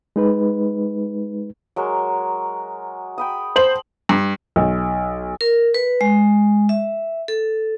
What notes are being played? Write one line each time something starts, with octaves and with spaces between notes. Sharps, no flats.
G#3 D#4 B4
F#3 G#3 A#4
G5 B5 D#6
C5 A5 C6 F#7
G2
B1
A#4
B4
G#3
E5
A4